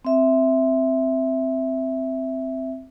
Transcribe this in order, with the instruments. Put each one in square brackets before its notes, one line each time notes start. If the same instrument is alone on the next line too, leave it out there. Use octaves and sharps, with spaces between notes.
[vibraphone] C4 E5